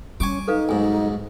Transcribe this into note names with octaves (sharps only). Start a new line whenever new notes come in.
G3 C#4 G#5 C#6 D6
D#4 A4 B4 F5
B1 G#2 G#5